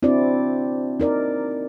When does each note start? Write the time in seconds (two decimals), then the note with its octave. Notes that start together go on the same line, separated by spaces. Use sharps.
0.03 C4 D4 E4 F#4 D5
1.00 D#4 A#4 D5